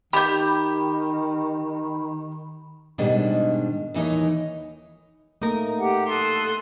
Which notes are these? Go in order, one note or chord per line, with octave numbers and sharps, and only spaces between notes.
D#3 G4 B5 G6
G#2 B2 D#3 G3 G#3 D4
D#2 E3 D#4 A#4 C#5
A3 A#3 D#4 A#4
G4 F#5
A4 C6 D#6 F#6